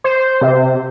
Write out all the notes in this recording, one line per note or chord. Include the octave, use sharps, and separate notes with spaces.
C5
C3